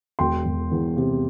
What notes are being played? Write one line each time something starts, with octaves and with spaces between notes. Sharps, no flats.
E1 G5 C6
E1
E2
C3